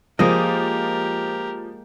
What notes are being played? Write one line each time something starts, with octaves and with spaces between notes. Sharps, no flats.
F3 G#3 A#3 G4 A#4 D#5